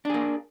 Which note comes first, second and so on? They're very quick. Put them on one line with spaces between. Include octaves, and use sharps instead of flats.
D4 G#4 A#3